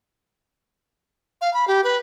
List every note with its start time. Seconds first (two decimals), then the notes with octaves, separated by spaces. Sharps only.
1.41 F5
1.54 B5
1.68 G4
1.84 B4